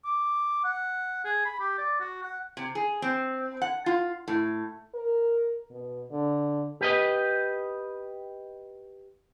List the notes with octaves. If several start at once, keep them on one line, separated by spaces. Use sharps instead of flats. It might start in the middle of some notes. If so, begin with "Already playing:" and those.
D6
F#5
G#4
B5
G4
D5
F#4
F#5
C3
G#4
C4
F#5
F4
A2
A#4
B2
D3
G4 B4 D#5